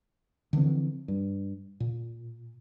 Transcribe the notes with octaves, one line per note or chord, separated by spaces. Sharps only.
D3 E3 F3 C4
G2
A#2